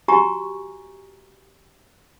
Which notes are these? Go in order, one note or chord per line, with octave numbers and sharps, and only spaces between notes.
F#4 G4 G#5 A#5 C#6